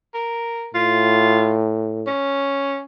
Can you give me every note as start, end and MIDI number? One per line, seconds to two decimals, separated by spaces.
0.14 0.69 70
0.74 2.07 45
0.74 1.62 65
2.07 2.80 61